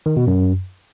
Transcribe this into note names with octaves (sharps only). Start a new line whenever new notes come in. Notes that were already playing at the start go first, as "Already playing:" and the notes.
D#3
B2
F#2